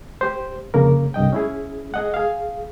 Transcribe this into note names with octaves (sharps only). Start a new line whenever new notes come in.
G4 C5
F2 C#3 A#3 A#4
C2 G2 D#5 G5
C#4 E4 G#4
G#4 D#5 F#5
G#4 F5